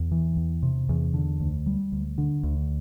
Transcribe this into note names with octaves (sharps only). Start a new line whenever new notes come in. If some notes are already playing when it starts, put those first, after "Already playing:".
Already playing: E2
E3
E2
C3
E2
D3
D2
G3
D2
D3
D2